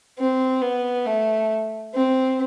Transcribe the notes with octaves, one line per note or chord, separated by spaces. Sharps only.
C4
B3
A3
C4